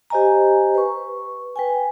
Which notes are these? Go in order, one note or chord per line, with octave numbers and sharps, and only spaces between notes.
G4 C5 D#5 G#5 A#5
B4 C#6
B4 G5 G#5